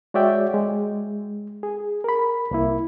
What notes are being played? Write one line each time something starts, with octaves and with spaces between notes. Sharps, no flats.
G#3 F#4 C#5 D5 E5 G5
G#3
G#4
A#4 B5
C2 A#3 E4